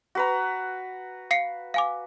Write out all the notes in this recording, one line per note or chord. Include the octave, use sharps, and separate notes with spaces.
F#4 B4 A#5
F5 C7 C#7
F5 G#5 D6